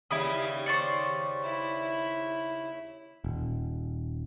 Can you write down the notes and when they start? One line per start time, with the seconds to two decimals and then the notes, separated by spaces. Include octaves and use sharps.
0.11 D#2 C#3 G3 E4 B5 D#6
0.66 C5 D5 C#6 A6 C#7
1.44 E4
3.24 D#1